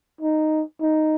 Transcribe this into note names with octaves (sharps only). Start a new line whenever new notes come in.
D#4
D#4